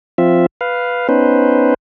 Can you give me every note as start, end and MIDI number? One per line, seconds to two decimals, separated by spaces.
0.18 0.46 53
0.18 0.46 60
0.18 0.46 65
0.18 0.46 76
0.61 1.08 71
0.61 1.08 77
1.09 1.74 59
1.09 1.74 61
1.09 1.74 63
1.09 1.74 71
1.09 1.74 72